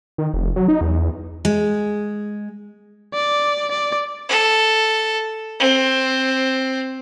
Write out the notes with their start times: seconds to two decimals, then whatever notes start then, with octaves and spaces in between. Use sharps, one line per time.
0.18 D#3
0.34 F1
0.56 F#3
0.68 D#4
0.81 E2
1.45 G#3
3.14 D5
3.71 D5
4.29 A4
5.60 C4